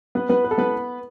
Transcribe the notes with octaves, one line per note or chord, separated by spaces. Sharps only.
B3 B4
B3 B4
B4
A4
B3 B4